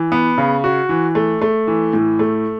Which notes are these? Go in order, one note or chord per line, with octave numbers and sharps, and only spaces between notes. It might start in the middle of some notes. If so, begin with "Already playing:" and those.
Already playing: E3
B3
C#3
F#4
E3
A3
A3
E3
A2
A3